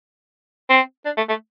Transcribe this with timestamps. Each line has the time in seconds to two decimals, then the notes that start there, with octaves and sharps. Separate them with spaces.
0.70 C4
1.05 D4
1.17 A3
1.29 A3